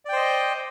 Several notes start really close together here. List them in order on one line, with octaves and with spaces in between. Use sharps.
D5 G5 C5 D#5